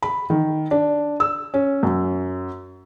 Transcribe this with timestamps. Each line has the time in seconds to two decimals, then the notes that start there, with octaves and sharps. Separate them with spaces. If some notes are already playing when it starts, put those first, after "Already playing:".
0.03 B5
0.30 D#3
0.71 D4
1.20 E6
1.54 C#4
1.83 F#2